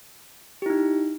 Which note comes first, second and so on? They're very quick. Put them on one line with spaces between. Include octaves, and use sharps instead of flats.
G4 E4 D#4